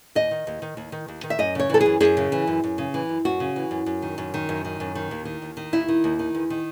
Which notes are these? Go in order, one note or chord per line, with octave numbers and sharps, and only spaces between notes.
D#2 D#5
D#3
D#2
D#3
D#2
D#3
D#2
D#3
E5
F#2 D#5
C#3 C#5
E3 A4
G#4
F#2
F#2 G#4
C#3
E3
F#2
F#2
C#3
E3
F#2
F#2 F#4
C#3
E3
F#2
F#2
D#3
F#2
D#3
F#2
D#3
F#2
D#3
D#2
D#3
D#2
D#3
D#2 E4
D#3
D#2
D#3
E2
D#3